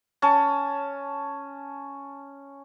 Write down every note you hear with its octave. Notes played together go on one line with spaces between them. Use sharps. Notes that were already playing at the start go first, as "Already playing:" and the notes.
C#4 A5